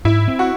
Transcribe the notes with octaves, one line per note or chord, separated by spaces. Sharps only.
G#2 E4
C4
F#4